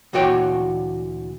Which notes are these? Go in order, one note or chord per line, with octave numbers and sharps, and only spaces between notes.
D2 A#2 E3 F#4 C#5 G5